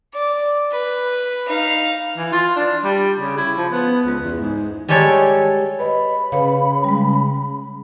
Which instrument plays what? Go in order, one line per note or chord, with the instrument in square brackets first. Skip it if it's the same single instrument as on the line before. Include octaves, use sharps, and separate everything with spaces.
[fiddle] D5
B4
D#4 F5
[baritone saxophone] E3
F4
D4
G3
C#3
E4
F3
B3
C#2
E2
G#2
[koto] G3 G#3 G4 A4 C#5
[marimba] B4 C#5 D#5 [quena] B5
[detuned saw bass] C#3 [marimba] B4 C#5 F5
[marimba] G3 G#3